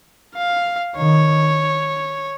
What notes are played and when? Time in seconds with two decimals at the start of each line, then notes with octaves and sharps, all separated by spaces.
0.35 F5
0.97 D#3 C#5